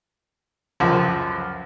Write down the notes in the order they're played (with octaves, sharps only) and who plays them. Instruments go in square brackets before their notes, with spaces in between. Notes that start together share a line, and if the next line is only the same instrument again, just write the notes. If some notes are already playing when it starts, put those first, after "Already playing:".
[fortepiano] C#2 F#2 F3